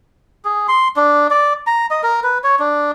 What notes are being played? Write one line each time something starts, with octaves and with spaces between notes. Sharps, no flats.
G#4
C6
D4
D5
A#5
D#5
A#4
B4
C#5
D4